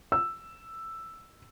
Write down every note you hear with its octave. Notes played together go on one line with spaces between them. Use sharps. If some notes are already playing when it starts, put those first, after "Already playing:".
E6